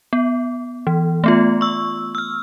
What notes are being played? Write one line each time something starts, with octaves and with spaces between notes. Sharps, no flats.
B3
E3
A3 B3 F4
C#6 E6
E6 F6